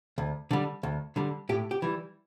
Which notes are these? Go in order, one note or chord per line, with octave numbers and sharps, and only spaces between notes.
D2
D3 G3
D2
D3 G3
A2 G4
G4
E3 G3